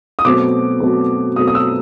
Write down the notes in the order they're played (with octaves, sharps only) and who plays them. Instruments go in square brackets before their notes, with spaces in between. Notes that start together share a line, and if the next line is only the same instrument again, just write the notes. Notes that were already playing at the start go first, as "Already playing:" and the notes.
[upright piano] D#6
B2 F#3 A3 C4 D6
B2 F#3 A3 C4
B2 F#3 A3 C4 D#6
D#6
E6